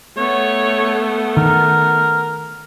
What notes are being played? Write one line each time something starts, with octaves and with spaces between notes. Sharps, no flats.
A3 B3 C#5
D#3 A#4